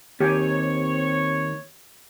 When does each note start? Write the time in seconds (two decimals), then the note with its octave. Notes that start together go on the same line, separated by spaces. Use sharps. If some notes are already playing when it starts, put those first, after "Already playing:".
0.20 D#2 C4 G4 C#5 G5 G#5